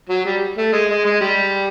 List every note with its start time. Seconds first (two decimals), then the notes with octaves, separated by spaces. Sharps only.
0.09 F#3
0.25 G3
0.58 A3
0.73 G#3
0.90 G#3
1.05 G#3
1.21 G3